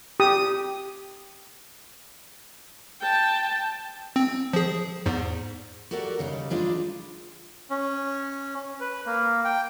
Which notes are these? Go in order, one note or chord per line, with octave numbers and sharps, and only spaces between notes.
G4 D#6
G5 A5
C4
F3 G#4
E2 G#2
F#4 G4 A4 A#4 D5 F#5
D#2 C#3 G3 D#4
G3 G#3 D4 D#4 F4
C#4
B4
A#3
G5